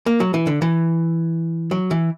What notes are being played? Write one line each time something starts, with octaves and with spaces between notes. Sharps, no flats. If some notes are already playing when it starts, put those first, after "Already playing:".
A#3
F#3
E3
D3
E3
F#3
E3